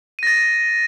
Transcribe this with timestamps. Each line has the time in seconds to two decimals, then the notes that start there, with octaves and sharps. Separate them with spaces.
0.19 D#7
0.23 A#6
0.27 A6